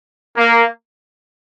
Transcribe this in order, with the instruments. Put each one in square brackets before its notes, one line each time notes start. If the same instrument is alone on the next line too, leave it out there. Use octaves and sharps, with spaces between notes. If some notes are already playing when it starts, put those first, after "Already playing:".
[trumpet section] A#3